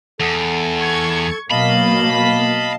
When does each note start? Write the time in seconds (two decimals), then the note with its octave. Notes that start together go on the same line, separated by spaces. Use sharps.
0.20 E2 A4
0.81 C#6 G#6
1.51 B2 F#3 A#3 D#5 F5 A5 B5